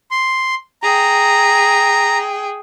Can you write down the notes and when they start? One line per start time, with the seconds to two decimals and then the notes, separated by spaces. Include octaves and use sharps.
0.11 C6
0.82 G#4 G5 A#5